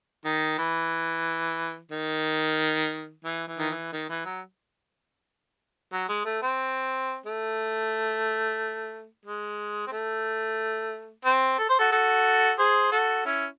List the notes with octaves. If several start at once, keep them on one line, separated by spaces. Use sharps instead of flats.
D#3
E3
D#3
E3
E3
D#3
E3
D#3
E3
F#3
F#3
G#3
A3
C4
A3
G#3
C4
A3
C4
A4
C5
F#4 A4
F#4 A4
G#4 C5
F#4 A4
C#4 E4